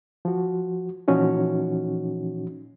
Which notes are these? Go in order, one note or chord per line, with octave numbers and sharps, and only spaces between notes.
F3 F#4
A#2 E3 F3 C#4 D#4 F#4